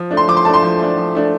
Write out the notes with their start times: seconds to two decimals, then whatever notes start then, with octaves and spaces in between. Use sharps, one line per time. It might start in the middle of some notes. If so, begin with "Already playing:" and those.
Already playing: F3
0.11 A3 D4
0.17 C6
0.28 F3 D6
0.37 C6
0.45 A3 D4 A5
0.54 C6
0.63 F3
0.80 A3 D4
0.97 F3
1.15 A3 D4